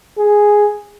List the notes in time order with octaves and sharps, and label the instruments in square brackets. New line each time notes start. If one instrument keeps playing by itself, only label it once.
[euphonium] G#4